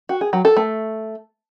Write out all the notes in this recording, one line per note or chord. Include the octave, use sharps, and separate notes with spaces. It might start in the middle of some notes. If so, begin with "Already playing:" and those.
F#4
G#4
F#3
A4
A3